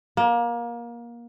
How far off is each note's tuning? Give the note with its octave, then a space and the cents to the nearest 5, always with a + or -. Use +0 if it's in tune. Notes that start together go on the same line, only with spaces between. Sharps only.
A#3 +25